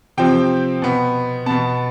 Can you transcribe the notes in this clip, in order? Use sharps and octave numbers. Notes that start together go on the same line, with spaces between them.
C3 F3 C4 G5
B2 B3
B2 B3 A5